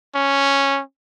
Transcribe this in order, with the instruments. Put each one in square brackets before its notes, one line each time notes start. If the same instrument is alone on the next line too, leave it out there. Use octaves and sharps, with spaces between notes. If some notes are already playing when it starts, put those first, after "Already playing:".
[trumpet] C#4